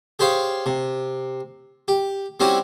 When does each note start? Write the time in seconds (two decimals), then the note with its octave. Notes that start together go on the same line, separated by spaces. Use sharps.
0.19 G4 G#4 C5 C#5 F5
0.66 C3
1.88 G4
2.40 G3 C4 C#4 E4 F#4 G4